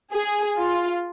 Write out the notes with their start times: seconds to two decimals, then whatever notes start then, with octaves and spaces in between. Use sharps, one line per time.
0.12 G#4
0.58 F4